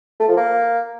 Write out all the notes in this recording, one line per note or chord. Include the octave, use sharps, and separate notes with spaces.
A3
F3
A#3